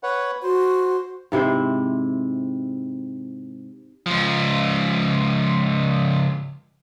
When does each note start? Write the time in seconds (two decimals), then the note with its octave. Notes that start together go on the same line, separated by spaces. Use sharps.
0.03 B4 C#5 F#5
0.43 F#4 C5
1.32 G#2 C3 E4 C5
4.06 C#2 F3